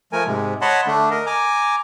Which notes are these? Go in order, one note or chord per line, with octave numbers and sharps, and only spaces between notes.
F3 A3 A#4 G#5
G#2 C3 G#3
C#5 D#5 F#5 A5 B5 C6
D3 A3 D4
A#4 D#5
G#5 A#5 D6